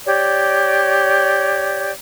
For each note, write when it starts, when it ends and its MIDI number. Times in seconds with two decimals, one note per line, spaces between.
0.05 1.91 67
0.05 1.91 73
0.05 1.91 74